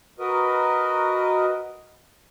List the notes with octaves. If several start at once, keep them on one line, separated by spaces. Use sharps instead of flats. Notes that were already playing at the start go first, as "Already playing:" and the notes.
F#4 A#4 B4 D#5